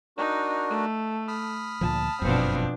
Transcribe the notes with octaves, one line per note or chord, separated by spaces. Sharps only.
D4 D#4 F#4 A#4
A3
B5 D#6 F6
D2 A#2 F3 A5
G1 F#2 B2 F3 C4 D4